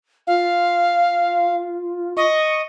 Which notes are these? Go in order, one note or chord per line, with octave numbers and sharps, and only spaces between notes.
F4 F5
D#5 C#6